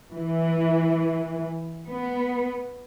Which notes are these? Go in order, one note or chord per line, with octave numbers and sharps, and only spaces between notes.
E3
B3